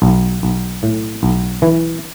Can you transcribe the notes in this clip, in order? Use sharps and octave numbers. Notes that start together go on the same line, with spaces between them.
B1
B1
A2
B1
E3